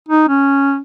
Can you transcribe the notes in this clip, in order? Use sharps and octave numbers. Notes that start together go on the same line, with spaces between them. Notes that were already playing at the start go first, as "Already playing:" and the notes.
D#4
C#4